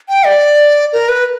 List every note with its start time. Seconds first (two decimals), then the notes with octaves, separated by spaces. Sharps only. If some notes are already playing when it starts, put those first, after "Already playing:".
0.09 G5
0.25 D5
0.93 A#4
1.09 B4